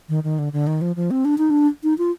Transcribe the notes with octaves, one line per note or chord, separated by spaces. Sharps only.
D#3
D#3
D3
D3
D#3
F3
F3
C4
D4
D#4
D4
D#4
F4